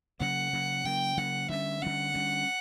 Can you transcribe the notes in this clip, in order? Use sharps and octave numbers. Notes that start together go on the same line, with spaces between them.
C#3 F#3 A#3 F#5
C#3 F#3 A#3
C#3 F#3 A#3 G5
C#3 F#3 A#3 F#5
D3 G3 C#4 E5
D3 G3 C#4 F#5
D3 G3 C#4